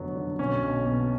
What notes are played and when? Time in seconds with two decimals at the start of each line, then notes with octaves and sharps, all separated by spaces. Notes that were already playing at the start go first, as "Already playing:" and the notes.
Already playing: F1 D3 F#3 B3
0.16 D3
0.39 B1 C#4
0.63 B1
0.85 B2